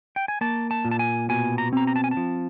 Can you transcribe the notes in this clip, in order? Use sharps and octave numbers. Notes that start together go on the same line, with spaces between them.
G5
G#5
A#3 A5
A5
A#2
A5
G#5
B2 G#5
A#5
C4 A#5
A#5
A5
G#5
A5
F3